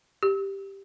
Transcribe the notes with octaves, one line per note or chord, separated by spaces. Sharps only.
G4